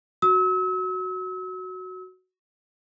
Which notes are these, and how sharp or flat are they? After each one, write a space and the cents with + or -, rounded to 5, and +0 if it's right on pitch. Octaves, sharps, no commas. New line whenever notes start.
F#4 +0 E6 -40